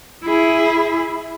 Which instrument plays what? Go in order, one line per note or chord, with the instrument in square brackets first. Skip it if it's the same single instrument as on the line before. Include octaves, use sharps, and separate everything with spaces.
[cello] E4 G#4